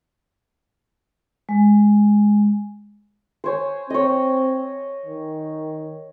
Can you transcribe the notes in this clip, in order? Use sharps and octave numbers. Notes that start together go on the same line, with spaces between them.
G#3
C5 C#5 G#5
C4 C#5 D#5
D#3